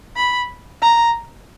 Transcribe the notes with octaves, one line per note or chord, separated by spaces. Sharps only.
B5
A#5